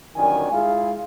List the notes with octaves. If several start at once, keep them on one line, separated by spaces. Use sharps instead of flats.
G1 F#2 D#3 F#4 D5 G#5
G#3 E4 F4 G#4 F5